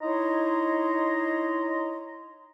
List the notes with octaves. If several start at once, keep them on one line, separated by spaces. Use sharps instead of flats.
D#4 E4 C#5 D#5 A#5 C6